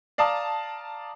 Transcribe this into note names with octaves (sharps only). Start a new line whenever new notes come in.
D5 F5 A5 A#5 D#6